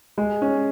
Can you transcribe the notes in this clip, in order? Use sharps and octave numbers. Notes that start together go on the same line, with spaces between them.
G#3
C#4